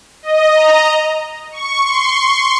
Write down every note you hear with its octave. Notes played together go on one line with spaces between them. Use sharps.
D#5
A#5
C#6
C6